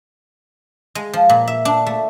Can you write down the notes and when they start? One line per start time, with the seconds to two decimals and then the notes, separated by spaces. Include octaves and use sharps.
0.95 G#3
1.13 F3
1.29 A#2
1.48 E5
1.65 D4
1.86 A3